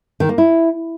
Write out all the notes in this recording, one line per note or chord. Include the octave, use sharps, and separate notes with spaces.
D#3
A#3
E4